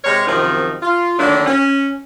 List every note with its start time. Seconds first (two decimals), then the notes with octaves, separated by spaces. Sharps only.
0.04 C3 G#3 A#4 C#5
0.27 F#2 C3 D#3 F3 C4 D#4
0.82 F4
1.19 D3 D#3 F#3 A3 A#3 D4
1.46 C#4